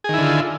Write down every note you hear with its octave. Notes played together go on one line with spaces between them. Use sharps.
D3 D#3 E4 F4 G#4